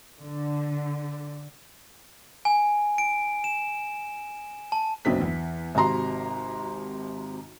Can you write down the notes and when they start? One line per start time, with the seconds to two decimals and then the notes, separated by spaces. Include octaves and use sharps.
0.21 D3
2.45 G#5
2.98 D7
3.44 E7
4.72 A5
5.05 F#1 B1 F#3 C4 D4 B6
5.22 E2
5.75 G#1 C3 F#4 A#5 C6